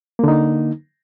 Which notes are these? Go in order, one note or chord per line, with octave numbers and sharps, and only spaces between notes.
D3 A#3 D#4